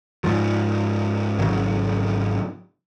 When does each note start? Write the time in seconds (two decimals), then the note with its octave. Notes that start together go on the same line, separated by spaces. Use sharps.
0.24 G#2 F3
1.39 G#1 C#3 F#3